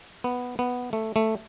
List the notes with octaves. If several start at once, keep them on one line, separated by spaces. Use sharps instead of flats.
B3
B3
A3
A3